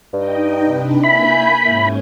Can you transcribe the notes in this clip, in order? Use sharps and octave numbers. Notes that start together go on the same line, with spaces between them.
G2 D#4 D#5 G5
C3 D4 B4
A#3 E4 G#5 B5 G6
G#2 C#4 E4